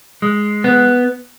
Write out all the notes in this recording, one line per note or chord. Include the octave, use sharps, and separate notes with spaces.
G#3
B3